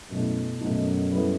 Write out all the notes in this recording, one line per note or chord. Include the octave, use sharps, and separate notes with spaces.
F#2 B2 A3 E4
F#2 B2 A3 D#4 F#4 A4
G3 B3 E4 A4